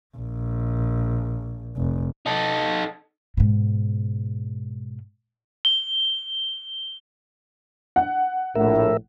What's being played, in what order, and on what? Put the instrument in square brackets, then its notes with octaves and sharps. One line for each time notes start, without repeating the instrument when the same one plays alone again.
[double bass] A#1
F1
[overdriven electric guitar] D#4 A4
[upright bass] G#2 B2
[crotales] G7
[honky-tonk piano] F#5
[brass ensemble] A#1 A2 [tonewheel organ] A#4 E5